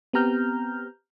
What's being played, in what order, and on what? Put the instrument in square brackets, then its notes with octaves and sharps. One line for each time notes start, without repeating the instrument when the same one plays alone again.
[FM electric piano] B3 C4 G4 A#5 F6 G6